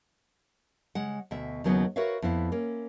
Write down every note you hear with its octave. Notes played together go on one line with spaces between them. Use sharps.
C#3 G#3 F#5
D2 B2 E5
D#2 C#3 F#3 B3 D#4 F#5
F#4 A#4 B4 C#5 E5 F5
F2 B3 E4 F5
A#3 C#4